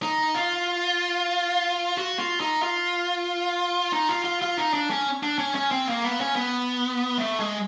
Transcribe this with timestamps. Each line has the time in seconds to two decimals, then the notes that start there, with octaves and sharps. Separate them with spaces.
0.02 D#4
0.34 F4
1.98 F#4
2.19 F4
2.40 D#4
2.63 F4
3.93 D#4
4.09 F4
4.24 F4
4.42 F4
4.57 D#4
4.74 D4
4.90 C#4
5.23 D4
5.38 C#4
5.55 C#4
5.71 C4
5.88 A#3
6.04 B3
6.21 C#4
6.36 B3
7.18 A3
7.40 G#3